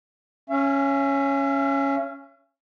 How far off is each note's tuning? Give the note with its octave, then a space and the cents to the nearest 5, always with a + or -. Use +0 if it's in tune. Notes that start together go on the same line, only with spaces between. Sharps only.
C#4 +0 E5 +40